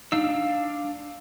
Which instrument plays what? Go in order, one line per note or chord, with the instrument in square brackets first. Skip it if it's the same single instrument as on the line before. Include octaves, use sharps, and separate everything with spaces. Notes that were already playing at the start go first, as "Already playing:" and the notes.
[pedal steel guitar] D4 F5 E6 [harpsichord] D#4